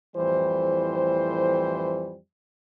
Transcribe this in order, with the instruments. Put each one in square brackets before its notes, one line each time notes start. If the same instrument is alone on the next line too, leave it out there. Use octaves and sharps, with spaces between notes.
[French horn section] F2 A2 E3 G3 C5